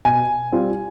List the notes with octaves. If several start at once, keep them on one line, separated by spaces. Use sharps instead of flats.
B2 G#5
G3 C4 F4